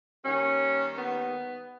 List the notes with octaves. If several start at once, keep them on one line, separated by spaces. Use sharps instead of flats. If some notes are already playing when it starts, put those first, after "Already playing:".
D#2 D#3 G3 C#4
B3